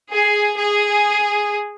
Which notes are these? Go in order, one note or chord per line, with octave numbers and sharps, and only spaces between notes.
G#4
G#4